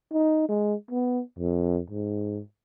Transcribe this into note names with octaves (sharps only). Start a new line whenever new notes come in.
D#4
G#3
B3
F2
G#2